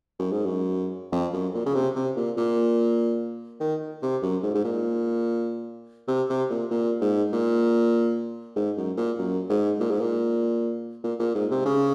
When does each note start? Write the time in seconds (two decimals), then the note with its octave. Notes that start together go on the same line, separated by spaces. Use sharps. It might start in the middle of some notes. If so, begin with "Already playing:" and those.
0.19 F#2
0.32 G#2
0.45 F#2
1.12 F2
1.33 F#2
1.54 A#2
1.66 C#3
1.74 C3
1.95 C3
2.16 A#2
2.37 A#2
3.60 D#3
4.02 C3
4.22 F#2
4.43 G#2
4.55 G#2
4.64 A#2
6.08 C3
6.29 C3
6.50 A#2
6.70 A#2
7.01 G#2
7.33 A#2
8.56 G#2
8.77 F#2
8.97 A#2
9.18 F#2
9.50 G#2
9.80 A#2
9.91 G#2
10.00 A#2
11.03 A#2
11.19 A#2
11.35 G#2
11.50 C3
11.65 C#3